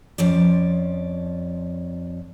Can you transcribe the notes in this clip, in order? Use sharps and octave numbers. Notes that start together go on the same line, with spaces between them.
F2 F3 C#4 D5